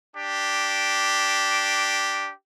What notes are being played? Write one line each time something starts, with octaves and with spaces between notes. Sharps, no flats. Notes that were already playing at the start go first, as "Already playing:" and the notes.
D4 G4